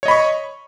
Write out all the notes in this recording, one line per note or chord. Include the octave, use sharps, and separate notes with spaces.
C#5 D#5 B5 C#6